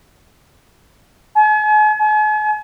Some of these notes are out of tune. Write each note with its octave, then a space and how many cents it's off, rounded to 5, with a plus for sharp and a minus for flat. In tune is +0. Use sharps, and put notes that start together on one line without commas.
G#5 +45
G#5 +45